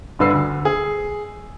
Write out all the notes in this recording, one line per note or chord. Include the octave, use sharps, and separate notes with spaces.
G1 G2 D3 B4 E6 C7
D2
G#4